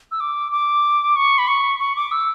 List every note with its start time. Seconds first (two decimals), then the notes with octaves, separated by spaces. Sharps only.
0.12 E6
0.20 D6
0.52 D6
1.16 C#6
1.38 B5
1.48 C#6
1.80 C#6
1.96 D6
2.11 E6